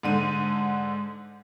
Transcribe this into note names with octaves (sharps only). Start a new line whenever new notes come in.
G#2 D3 D#7